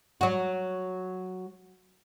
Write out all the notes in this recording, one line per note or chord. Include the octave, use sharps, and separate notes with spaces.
F#3 F#4